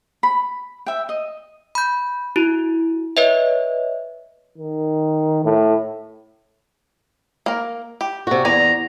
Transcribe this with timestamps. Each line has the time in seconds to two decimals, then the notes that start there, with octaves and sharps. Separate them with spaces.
0.23 B5
0.86 E5 G5
1.09 D#5
1.75 B5 G6
2.36 E4 F#4
3.17 B4 C#5 D#5 E5
4.58 D#3
5.45 A2
7.46 A#3 A#4
8.01 G4
8.27 C3 F#4
8.45 E2 D5 G#5 A#5